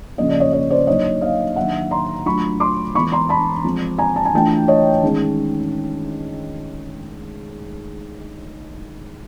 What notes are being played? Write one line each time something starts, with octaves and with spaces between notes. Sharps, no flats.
C#3 F3 A#3 D#5
D5
C#5 D#5
C#5 D#5
C5 D5
D3 F#3 A#3 D#4 C#5 D#5
D#5 F5
D#3 F#3 A#3 D4 E5 F#5
A#5 C6
F#3 A3 D4 F4 B5 C#6
C6 D6
E3 G#3 B3 E4 B5 C#6
A#5 C6
A5 B5
F3 G#3 C4
G#5 A#5
A5
G#5
E3 A3 D4 F4 G5 A5
C#5 D#5
D#3 G#3 C#4